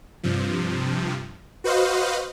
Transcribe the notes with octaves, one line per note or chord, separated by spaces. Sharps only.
G2 C3 F3
F#4 B4 C5 D#5 F5